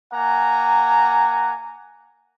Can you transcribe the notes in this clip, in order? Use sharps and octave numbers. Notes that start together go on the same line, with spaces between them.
A#3 F#5 G#5 A#5